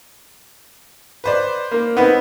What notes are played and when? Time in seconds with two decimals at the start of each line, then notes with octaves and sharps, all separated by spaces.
1.24 B4 C5 D5
1.71 A#3
1.97 B3 C4 D#4 B4